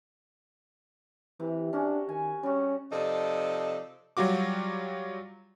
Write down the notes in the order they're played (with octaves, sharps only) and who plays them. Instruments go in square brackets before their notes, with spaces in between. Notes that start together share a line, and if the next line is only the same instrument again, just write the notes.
[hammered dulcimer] C3 [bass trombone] E3
[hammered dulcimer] C#4 F#4 [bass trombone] D4
[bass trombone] D#3 [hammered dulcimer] G#5
[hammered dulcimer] G3 F#4 [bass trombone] C#4
[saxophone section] C3 F3 D#4 A4 D5 D#5
[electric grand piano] F#3 G3 F4 F#4 D6